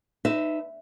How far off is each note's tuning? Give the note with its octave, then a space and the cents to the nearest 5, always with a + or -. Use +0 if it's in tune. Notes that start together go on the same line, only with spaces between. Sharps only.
D#4 -10 B4 +25 E5 +0